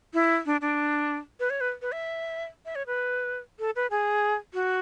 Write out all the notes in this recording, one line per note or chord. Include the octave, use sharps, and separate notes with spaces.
E4
D4
D4
B4
C#5
B4
B4
E5
E5
C#5
B4
A4
B4
G#4
F#4